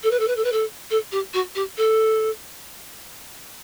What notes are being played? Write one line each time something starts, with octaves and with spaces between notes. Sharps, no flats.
A4
B4
A4
B4
A4
B4
A4
A4
G4
F#4
G4
A4